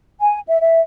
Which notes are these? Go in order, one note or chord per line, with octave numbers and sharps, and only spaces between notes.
G#5
E5
E5